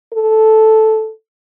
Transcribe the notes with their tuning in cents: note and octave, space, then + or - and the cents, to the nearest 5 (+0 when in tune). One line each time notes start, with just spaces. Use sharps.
A4 -5